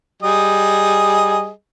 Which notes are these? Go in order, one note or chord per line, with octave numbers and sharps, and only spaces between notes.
G3 G#4 D#5